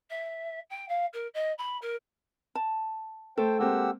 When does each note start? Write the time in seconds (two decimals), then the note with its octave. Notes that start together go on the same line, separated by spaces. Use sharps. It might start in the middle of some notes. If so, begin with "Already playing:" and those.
0.10 E5
0.70 G5
0.88 F5
1.13 A#4
1.34 D#5
1.58 B5
1.81 A#4
2.55 A5
3.38 A3 A4 C5 G5
3.59 G#3 A#3 C4 G4 F#5 E6